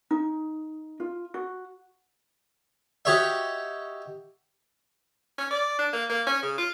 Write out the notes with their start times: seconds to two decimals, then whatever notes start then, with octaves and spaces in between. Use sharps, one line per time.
0.11 D#4
1.00 F4
1.34 F#4
3.05 F#4 G4 C#5 D#5 E5
5.38 C#4
5.51 D5
5.78 D4
5.93 A#3
6.09 A#3
6.27 C#4
6.42 C#3
6.58 F4